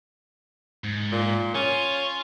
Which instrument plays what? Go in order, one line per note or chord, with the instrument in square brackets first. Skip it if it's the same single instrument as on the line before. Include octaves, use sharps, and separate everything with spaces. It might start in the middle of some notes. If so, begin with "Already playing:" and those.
[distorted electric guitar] G#2
[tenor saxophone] A#2
[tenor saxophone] C#4 [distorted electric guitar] F4